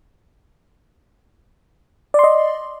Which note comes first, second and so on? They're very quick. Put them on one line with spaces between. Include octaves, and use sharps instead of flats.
D5 C6 D#5